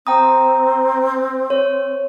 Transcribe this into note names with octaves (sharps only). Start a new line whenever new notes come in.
C4 G5 A#5 D#6
C#5